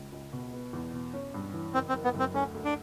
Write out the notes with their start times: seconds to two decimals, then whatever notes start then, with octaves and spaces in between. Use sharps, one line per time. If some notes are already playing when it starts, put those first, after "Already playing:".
Already playing: C#2 C#3
0.12 C#2
0.33 B2
0.53 B3
0.73 E2
0.93 B2
1.13 C#4
1.34 G2
1.53 E3
1.74 F#1 C4
1.89 C4
1.94 F#1
2.04 B3
2.14 F#2
2.20 C4
2.34 D2 C#4
2.54 D2
2.65 D4